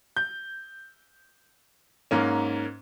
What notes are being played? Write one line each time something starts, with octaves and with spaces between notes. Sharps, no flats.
G6
G#2 A#3 C#4